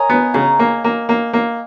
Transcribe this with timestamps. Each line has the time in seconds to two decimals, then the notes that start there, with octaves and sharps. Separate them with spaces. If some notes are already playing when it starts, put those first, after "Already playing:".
Already playing: A#4 C#5 D#5 F#5 G#5 A#5
0.09 B3
0.34 C#3 A#5
0.59 A#3
0.84 A#3
1.09 A#3
1.33 A#3